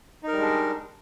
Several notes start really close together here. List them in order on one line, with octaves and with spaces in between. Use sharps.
D#4 A#4 G3 G#3 D4